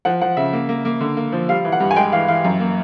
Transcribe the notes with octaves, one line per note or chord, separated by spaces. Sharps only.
F3 F#5
F3 F#5
C#3 E5
A#3
A#3
A#3
D3
A#3
F3
G3 F5
E3
F#5
G2
G#5
G#3 G5
E3 F5
E3 F5
F#2
A#3